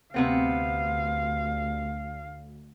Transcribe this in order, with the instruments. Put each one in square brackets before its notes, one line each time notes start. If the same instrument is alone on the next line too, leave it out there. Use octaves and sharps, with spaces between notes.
[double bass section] D2 [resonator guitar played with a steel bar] C3 B3 C4 [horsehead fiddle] F5